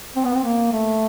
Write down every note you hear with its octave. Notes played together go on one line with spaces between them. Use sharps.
C4
B3
C4
A#3
A3